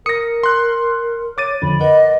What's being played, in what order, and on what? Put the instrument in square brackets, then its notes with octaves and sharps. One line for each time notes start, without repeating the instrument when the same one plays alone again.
[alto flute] A#4 [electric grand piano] D#6 A#6 [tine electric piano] C#7
[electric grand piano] C6 F#6
[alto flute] C#5 [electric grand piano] D6 A6 D#7
[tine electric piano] F2 D3 F3 [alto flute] B5
[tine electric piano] A#4 B4 F#5 [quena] D#5